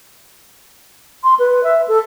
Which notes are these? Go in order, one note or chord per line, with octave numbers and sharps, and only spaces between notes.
C6
B4
E5
A4